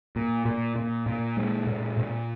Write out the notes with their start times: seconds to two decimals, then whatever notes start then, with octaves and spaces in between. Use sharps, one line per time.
0.16 A#2
0.45 A#2
0.76 A#2
1.06 A#2
1.37 G#3
1.67 A#2
1.97 A#2